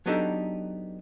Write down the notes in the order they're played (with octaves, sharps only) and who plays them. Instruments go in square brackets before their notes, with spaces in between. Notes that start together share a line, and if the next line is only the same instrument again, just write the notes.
[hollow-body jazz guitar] F#3 B3 D4 D#4 G4 A4